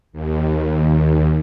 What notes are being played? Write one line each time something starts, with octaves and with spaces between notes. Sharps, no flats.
D#2